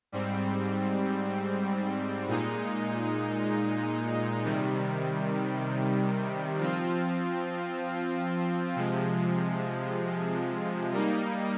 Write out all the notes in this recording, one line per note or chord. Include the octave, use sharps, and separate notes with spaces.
G#2 G3 C4
A#2 G#3 D#4
C3 D#3 G3
F3 C4 F4
C3 F3 G#3
G3 A#3 D#4